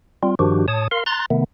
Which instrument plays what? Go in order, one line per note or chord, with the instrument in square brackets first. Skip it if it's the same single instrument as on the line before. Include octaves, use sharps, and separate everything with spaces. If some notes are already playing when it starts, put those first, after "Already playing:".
[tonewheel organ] G3 C4 F4
G2 D#3 F3 D4 F#4 G4
A2 C#5 A5 D#6
A#4 F5 C6
A#5 C6 F#6 A6
C3 D#3 A3 B3